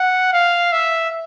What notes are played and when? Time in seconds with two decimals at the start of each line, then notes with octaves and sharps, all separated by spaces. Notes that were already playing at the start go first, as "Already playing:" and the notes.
Already playing: F#5
0.33 F5
0.72 E5